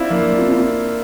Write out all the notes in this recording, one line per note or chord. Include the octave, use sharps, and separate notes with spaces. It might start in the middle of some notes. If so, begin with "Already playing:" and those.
Already playing: C4 D4 E4 F4
F3 A#3 D4
C4 F4